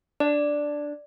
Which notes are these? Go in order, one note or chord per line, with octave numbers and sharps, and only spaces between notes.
D4 D5